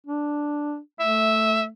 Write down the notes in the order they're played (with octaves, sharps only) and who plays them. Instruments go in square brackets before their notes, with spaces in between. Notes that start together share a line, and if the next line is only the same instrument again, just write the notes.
[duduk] D4
[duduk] A3 [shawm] E5